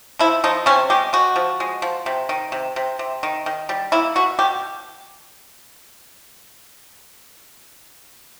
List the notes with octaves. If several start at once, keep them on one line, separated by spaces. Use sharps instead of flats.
F3 E4
F3 D#4
C3 C#4
G#3 G4
G#3 F#4
F3
G#3
F3
C3
D#3
C3
C3
C3
D#3
D#3
G3
A#3 E4
B2 F#4
B2 G4